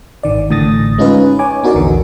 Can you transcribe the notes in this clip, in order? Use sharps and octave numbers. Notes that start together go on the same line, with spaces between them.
G#1 D#3 D5
A1 A2 D3 D#6 A6 A#6
G#3 C#4 D#4 F4 G#4 B4
C#5 G#5 D6
B3 D#4 F#4 A#4 D5
A#1 E2 D3